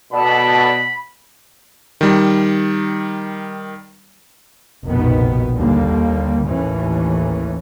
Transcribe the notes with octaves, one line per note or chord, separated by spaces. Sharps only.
B2 A4 D5 A5 B5
D#3 G3
F1 A#1 B2 D#3 B3
D#2 D3 G3 A#3
A1 D#2 A2 E3 C#4